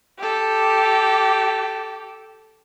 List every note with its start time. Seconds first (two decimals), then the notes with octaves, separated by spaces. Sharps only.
0.18 G4 A4